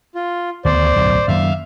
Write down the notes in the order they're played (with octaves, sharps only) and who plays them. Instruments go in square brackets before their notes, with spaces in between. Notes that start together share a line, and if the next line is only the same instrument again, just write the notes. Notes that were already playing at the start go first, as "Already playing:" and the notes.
[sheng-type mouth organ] F4
[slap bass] D2 D#3 B3 [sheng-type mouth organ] C5 D5
[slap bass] D1 B1 F#2
[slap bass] F#2 D#3 A#3 [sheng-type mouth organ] E5 F5 F6